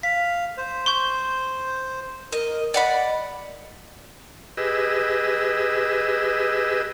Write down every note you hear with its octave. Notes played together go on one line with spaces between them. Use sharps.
F5 B6
C5
C6 C#6 G6
A#4 D#5
D5 D#5 F#5 B5
G4 G#4 B4 D#5 E6